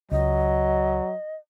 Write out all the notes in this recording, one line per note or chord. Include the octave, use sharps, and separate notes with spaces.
C#2 F#3 D#5